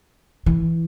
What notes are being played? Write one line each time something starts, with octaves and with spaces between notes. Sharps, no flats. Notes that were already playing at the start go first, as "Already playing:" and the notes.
E3